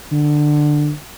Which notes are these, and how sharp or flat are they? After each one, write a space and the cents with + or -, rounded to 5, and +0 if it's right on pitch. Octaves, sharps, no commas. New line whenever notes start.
D3 +15